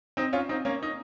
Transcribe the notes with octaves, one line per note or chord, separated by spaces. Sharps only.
C4 D#4
C#4 F4
C4 D#4
A#3 C#4
D#4